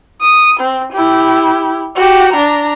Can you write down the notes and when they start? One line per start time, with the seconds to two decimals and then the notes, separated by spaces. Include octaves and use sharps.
0.21 D#6
0.60 C4
0.93 E4 G4
1.96 F#4 G4
2.33 D4 A#5